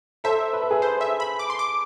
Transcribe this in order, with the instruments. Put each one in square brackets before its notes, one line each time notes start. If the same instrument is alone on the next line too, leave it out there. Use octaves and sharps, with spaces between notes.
[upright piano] A4 C5 [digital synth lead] E5
[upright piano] B4
A4
G#4 B4
[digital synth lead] C5
E5
B5
D6
C6
D6